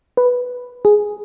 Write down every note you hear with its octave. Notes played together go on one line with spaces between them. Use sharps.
B4
G#4